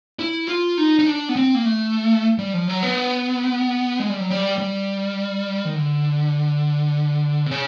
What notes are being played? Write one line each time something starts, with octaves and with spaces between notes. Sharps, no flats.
E4
F4
D#4
D#4
D4
B3
C4
A#3
A3
G3
F3
F#3
B3
G#3
G3
F#3
G3
G3
D#3
D3
C3
C#3